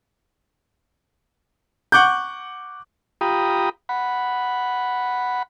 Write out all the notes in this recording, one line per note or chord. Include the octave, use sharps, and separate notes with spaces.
F#5 C#6 D6 F#6 G6
F4 G4 G5 A#5 B5 D#6
F#5 B5